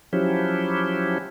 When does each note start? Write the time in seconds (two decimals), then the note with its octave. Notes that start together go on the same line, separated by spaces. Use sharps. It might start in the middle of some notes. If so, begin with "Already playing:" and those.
0.13 F3 F#3 C#4 E4 G4